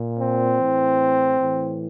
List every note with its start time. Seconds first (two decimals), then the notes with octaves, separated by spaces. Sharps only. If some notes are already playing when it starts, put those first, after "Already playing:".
Already playing: A#2
0.18 C4
0.57 A2 E3
1.36 A2 E3